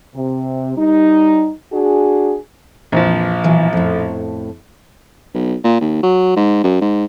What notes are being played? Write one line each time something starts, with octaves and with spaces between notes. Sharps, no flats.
C3
G3 D#4
D4 F#4 G#4
A#1 F2 E3 F3 C4
B2 E3 F#3
F2 A2
B1
A#2
D#2
F#3
G#2
F#2
G#2